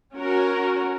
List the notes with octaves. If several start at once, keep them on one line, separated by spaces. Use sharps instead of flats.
C#4 F#4 A#4